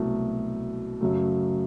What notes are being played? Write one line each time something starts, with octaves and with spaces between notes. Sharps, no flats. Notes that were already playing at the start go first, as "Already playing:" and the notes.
Already playing: C2 B2 F#3 A3
F#2 C#3 F#3 A3